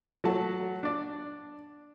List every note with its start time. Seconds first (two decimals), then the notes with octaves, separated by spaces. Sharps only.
0.24 F#3 A3 F#4 A5
0.83 D4 D5